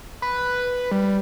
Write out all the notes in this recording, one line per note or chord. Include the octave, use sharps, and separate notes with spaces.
B4
G3